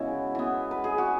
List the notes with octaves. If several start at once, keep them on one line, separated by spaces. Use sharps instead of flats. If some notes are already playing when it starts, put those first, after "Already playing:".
Already playing: C#3 E3 G#3 B3 E4 F#4
E3 B3
B4
G#4
F#4